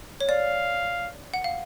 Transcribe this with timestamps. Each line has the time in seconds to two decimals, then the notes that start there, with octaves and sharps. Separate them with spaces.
0.21 C#5
0.29 D5 F5
1.34 F#5
1.44 F5